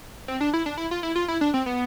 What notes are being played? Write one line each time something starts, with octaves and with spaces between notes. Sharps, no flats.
C4
D4
E4
D4
E4
F4
E4
F4
E4
D4
C4
B3